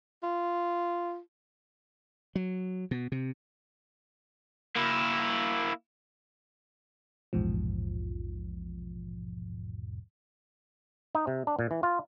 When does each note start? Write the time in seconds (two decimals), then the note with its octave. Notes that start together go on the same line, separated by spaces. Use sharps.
0.23 F4
2.35 F#3
2.91 B2
3.12 C3
4.76 A#3 E4
7.33 A#1 E2 G#2 B2 F3
11.15 D#4
11.27 C3
11.47 D4
11.59 A#2
11.71 E3
11.83 F4